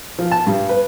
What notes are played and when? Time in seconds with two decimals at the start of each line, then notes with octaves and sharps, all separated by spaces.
0.19 F3
0.31 A5
0.47 G2
0.69 B4